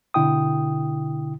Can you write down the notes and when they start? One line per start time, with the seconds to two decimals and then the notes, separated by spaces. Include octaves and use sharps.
0.14 B2 D3 E4 G5 D#6